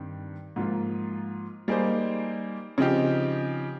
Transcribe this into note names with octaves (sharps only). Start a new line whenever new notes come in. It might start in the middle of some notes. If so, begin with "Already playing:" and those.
Already playing: G2 D#3 G3 C4
G#2 F3 A#3 F4
G3 A#3 D#4 G#4 C5
C#3 F3 C4 D#4 G4